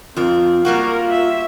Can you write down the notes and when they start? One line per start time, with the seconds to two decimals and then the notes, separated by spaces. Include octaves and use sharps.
0.17 F2 C4 F4 A#4
0.65 G3 A#3 F#4 A#4
1.10 E5